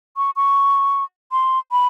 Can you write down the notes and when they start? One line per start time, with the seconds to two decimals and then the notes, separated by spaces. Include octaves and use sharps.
0.17 C#6
0.36 C#6
1.32 C6
1.72 B5